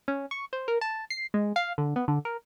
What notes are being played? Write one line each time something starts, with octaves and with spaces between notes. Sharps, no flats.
C#4
C#6
C5
A#4
A5
C7
G#3
F5
D3
B3
D3
A#4